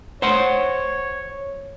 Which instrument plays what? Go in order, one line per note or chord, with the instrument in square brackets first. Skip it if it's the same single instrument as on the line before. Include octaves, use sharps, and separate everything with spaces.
[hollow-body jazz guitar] C5 F#5 C6 [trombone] C#5